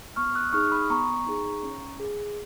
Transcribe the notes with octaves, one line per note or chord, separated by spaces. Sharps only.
B3 C#6 F6
D#6 F#6
D#4 G#4 C#6 F6
B5 D#6
B3 A#5 C#6
D#4 G#4
C#4
G#4